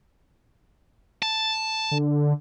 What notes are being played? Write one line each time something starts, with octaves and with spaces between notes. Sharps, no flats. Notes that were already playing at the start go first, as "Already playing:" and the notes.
A5
D3